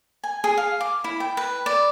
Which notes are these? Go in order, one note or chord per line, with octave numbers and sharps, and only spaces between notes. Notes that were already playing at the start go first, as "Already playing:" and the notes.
G#5
G#4
F5
D6
E4
G5
B4
D5